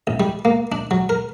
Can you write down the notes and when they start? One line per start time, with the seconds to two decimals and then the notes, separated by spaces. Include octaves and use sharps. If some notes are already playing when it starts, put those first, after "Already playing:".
0.07 A1
0.20 G3
0.45 A#3
0.72 D4
0.91 F#3
1.09 A#4